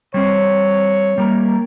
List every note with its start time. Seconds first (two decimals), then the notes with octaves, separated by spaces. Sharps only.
0.14 G3 C4 C#5
1.18 G3 A#3 A#4